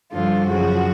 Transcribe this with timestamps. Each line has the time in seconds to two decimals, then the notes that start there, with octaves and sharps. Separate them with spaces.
0.11 G2 D3 F3 F4
0.47 F#2 C#3 F3 F#4